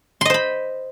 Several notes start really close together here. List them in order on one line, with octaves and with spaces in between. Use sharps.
C6 D#5 C5 B5